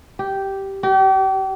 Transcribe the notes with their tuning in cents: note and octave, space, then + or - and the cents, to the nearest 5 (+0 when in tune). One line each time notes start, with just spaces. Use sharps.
G4 -10
G4 -35